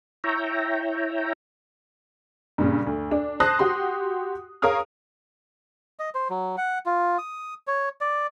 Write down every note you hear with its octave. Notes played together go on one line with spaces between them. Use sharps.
E4 C#5 E5 G5 A#5
G2 A#2 C#3
D2
D4
C5 A5 D#6 F#6 A#6 C7
F#4 G4 C6
G#4 A#4 C#5 F5 D#6 F6
D#5
C5
F#3
F#5
F4
D#6
C#5
D5